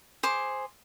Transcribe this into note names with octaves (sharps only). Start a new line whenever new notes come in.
G#4 C5 D6